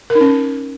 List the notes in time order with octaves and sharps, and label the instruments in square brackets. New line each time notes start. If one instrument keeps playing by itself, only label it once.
[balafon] A#4
D#4
C#4